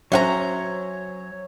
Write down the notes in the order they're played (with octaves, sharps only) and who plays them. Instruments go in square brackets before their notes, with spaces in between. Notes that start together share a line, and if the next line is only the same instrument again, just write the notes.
[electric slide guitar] F#3 [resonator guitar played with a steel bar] C#4 F#5 A#5 [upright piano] C5 E5 [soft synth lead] C#5